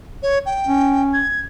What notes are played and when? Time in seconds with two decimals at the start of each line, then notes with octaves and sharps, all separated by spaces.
0.23 C#5
0.46 G5
0.67 C#4
1.14 G#6